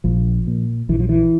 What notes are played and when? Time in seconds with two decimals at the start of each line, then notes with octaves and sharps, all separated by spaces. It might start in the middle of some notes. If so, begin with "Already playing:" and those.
0.04 A#1 F3
0.47 A#2
0.89 A#1 E3
0.99 F3
1.09 E3